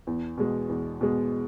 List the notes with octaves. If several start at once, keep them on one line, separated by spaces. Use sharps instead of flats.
E2
B2 G#3
E2
B2 G#3